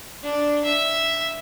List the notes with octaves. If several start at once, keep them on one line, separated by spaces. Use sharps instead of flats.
D4
E5